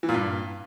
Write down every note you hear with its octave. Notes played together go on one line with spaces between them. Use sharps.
E3
A#2
G2